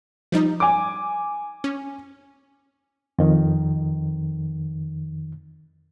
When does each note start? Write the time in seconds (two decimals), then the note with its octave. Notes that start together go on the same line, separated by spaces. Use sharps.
0.32 F3 G3 D#4
0.60 G#5 D6
1.64 C#4
3.19 F2 D#3